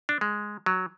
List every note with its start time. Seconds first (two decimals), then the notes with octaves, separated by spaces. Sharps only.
0.09 D4
0.21 G#3
0.66 F#3